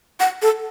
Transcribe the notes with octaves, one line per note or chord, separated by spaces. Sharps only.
F#5
A4